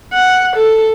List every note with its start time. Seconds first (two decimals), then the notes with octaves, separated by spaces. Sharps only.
0.14 F#5
0.56 A4